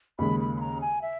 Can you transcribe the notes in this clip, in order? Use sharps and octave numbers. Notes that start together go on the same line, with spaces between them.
D#2 C#3 G#3 B5
B5
B5
A#5
G#5
E5